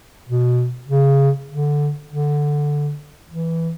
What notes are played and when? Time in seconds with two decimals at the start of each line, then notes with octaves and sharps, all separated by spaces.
0.29 B2
0.88 C#3
1.49 D3
2.09 D3
3.29 E3